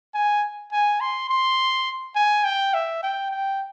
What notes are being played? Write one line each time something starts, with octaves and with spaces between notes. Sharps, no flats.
G#5
G#5
C6
C6
G#5
G5
E5
G5
G5